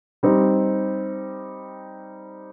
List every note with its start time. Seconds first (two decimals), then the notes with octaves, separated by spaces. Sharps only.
0.23 G3 C4 D#4